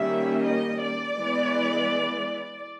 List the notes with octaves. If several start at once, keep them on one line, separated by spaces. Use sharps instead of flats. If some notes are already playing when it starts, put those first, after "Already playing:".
Already playing: D#3 G3 A#3 C#4 E5
D#5
D5
E3 G#3 B3